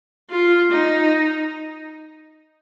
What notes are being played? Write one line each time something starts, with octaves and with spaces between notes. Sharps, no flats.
F4
D#4